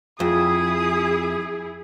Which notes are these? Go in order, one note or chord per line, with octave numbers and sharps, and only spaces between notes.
F2 E4 G#4 D#6